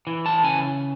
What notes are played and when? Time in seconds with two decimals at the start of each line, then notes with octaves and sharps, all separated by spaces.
0.07 E3
0.26 A5
0.43 C#3 G#5